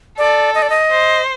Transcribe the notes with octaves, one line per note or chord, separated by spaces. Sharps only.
A4 D5
D#5
D5
D#5
C5